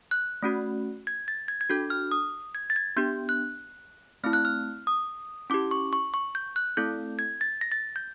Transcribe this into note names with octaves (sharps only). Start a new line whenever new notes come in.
F#6
A3 C#4 F#4
G#6
A6
G#6
G#6
D4 F#4 A4 G6
F6
D#6
G#6
A6
G#6
B3 D4 G4 G6
F#6
A3 C4 E4 F6
F#6
F6
D#6
C#4 E4 G4 D6
C#6
C#6
C#6
G6
F#6
A3 C4 E4 A4 G6
G#6
A6
A#6
A6
G6